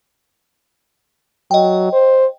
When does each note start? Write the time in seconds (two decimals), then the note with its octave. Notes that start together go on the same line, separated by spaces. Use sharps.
1.51 F#3 D#5 G5
1.93 C5